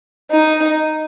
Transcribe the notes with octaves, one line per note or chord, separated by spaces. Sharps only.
D#4